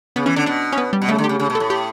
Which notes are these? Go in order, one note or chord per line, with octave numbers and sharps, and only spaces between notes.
C#3 B3
E3 C#4
D3 D4
B2 D4
C#4
B3
G3
B2
C#3 A3
D3
G4
C#3
C#3
B2
A4
A2
G4